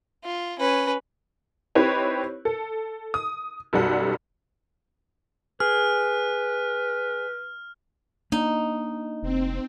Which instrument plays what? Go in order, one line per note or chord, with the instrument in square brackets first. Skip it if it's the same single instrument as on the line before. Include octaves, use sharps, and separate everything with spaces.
[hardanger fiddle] F4
C#4 B4
[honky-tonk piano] C4 D#4 E4 G4 B4 C#5
A4
D#6
B1 F#2 B2 G3 A4 F#5
[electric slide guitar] G#4 [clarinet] B4 [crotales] F6
[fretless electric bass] A#3 D4 [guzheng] D#4
[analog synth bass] F1 [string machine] C4